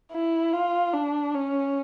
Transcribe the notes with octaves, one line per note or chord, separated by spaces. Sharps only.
E4
F4
D4
C#4